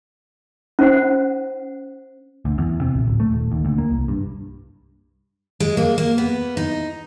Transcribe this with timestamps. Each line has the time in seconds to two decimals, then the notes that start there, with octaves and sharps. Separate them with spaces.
0.79 C#4 C5 F#5
2.45 D2
2.58 E2
2.81 C3
2.94 A#1
3.08 D1
3.20 A3
3.33 D#1
3.52 D#2
3.65 D2
3.78 A#3
3.91 C2
4.08 G2
5.60 G#3
5.77 A#3
5.98 A#3
6.18 B3
6.57 D#4